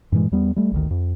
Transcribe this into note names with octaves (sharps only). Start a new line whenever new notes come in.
G2 A#2 E3 G#3
E2 G3 B3
G3 A3
G#1 D2 D#3
F2